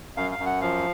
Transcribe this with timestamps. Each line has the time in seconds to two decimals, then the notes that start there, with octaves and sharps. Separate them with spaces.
0.16 F#2 F5
0.31 F5
0.39 F#2
0.46 F#5
0.61 F3 F5